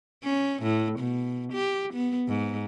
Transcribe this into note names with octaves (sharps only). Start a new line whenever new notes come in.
C#4
A2
B2
G4
B3
G#2